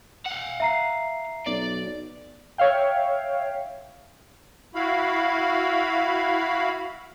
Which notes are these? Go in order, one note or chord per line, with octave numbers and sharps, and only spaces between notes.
F5 F#5
E5 A#5 C7
B1 D5
C#5 E5 F5 G5
E4 F#4 F5 B5